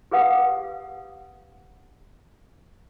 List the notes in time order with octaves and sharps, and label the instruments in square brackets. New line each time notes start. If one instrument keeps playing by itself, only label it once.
[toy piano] G4 G#4 B4 F5 F#5 D#6